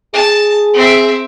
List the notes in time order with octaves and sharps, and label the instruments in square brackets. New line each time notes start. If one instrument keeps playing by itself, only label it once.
[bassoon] G#4 [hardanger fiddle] A5
[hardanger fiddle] C4 E5